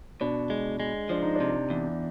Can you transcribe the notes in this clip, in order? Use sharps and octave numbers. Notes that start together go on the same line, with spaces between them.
B2 D4
G#3
G#3
F3 D4
D#4
D4
C3
E2